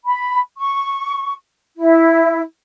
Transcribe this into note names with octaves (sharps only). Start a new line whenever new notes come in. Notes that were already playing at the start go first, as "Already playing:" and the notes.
B5
C#6
E4